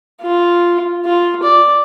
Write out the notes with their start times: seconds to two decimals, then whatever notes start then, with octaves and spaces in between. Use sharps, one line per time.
0.21 F4
1.05 F4
1.43 D5